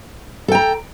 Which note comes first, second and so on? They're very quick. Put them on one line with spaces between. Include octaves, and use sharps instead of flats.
A4 G5 A#5